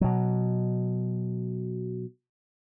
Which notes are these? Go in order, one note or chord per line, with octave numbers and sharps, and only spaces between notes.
B2 F#3